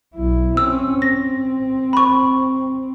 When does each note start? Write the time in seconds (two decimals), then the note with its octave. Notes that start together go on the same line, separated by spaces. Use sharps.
0.15 B1 E4
0.57 C4 C#4 E6
1.02 C4 A#6
1.93 B5 C#6